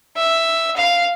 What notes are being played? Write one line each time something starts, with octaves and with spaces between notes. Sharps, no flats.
E5
F5